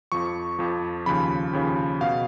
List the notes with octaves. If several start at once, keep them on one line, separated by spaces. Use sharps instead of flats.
F2 F3 C#6
F2 F3
D#2 C#3 F3 B5
D#2 C#3 F3
B2 F5